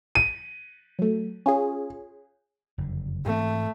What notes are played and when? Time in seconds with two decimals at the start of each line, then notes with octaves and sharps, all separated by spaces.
0.15 D#7
0.99 F#3 A3
1.46 C#4 F4 G#4
2.78 F#1 F2 D3
3.26 G#2 E3 A3 C4